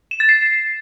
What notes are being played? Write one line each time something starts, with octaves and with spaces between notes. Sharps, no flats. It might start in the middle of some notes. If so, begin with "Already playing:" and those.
E7
A6
C7